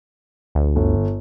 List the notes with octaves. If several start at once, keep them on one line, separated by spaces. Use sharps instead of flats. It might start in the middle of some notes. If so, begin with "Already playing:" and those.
D2
G1